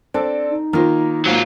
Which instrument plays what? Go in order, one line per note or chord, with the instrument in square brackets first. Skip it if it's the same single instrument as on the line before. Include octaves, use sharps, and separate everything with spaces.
[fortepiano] C4 A4 [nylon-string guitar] D4 D5
[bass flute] D#4
[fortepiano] D#3 [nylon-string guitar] A#3 F4 C5
[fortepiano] G#2 A#3 [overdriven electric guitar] F#3 F4